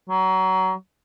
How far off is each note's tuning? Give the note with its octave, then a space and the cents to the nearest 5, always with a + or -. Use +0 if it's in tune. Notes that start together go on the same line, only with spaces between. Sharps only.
F#3 +25